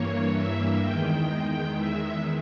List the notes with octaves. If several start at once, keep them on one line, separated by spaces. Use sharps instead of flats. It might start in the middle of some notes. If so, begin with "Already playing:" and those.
Already playing: G2 E3 A#3 C#5
E5
E2 D#3 G#3 G5
E5